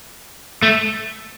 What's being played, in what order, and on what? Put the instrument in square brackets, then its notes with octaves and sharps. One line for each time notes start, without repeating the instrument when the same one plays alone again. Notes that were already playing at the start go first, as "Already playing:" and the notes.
[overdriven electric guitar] A3